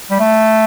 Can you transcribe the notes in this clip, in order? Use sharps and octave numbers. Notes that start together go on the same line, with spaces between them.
G3
A3